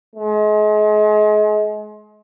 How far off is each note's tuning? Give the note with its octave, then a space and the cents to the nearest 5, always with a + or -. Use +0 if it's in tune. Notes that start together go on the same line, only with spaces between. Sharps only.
G#3 +35